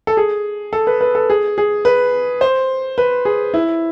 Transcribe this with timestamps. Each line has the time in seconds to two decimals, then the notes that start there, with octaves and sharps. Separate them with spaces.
0.07 A4
0.17 G#4
0.73 A4
0.87 B4
1.01 B4
1.15 A4
1.30 G#4
1.58 G#4
1.85 B4
2.41 C5
2.98 B4
3.25 G#4
3.54 E4